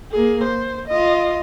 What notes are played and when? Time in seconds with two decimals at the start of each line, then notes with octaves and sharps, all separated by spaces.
0.12 A#3 G#4
0.43 C5
0.88 F4 D#5